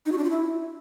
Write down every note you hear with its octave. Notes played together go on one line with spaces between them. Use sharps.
D#4
F#4
D4
F4
E4